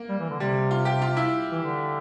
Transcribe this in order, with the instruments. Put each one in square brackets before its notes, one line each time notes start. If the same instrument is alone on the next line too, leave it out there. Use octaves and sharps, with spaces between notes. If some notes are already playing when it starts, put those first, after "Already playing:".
Already playing: [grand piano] A#3
[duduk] G3
E3
D3
[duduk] C3 [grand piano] G3
[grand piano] F4
G4
F4
E4
[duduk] E3
D3